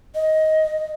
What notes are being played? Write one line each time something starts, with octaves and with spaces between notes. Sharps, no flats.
D#5